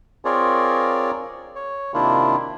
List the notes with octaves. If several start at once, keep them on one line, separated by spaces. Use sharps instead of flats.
C4 F4 G#4 A#4 C#5 D5
C#5
C3 D#3 A#3 D4 E4 F4